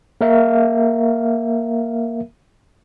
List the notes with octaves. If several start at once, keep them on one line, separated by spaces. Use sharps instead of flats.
A#3 A#4 E5 F5